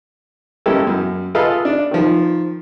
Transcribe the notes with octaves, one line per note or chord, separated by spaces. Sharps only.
G#3 A#3 C#4 E4 G4 A4
F#2
F4 G#4 A4 B4 D#5 F5
D4
D#3 F3